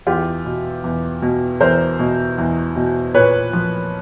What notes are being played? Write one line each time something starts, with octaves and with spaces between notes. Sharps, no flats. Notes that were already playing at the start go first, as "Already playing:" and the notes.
E2 F4 G4
B2
E2
B2
E2 A#4 C5
B2
E2
B2
A#2 B4 C#5
F3